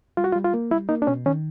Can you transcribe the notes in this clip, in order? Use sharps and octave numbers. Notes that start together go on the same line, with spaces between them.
G3 F4
F#4
F4
G3
F4
A#3
G3 E4
A#3 D#4
D4
B2 C#4
D#3 C#4